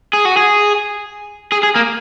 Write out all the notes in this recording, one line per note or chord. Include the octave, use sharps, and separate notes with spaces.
G#4
F#4
G#4
G#4
G#4
A#3